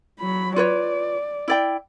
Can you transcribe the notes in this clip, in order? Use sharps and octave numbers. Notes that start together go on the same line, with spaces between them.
F#3 B5
F4 B4 C#5 D5
E4 D5 G5